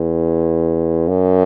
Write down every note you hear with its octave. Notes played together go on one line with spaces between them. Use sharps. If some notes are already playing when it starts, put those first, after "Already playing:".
Already playing: E2
F#2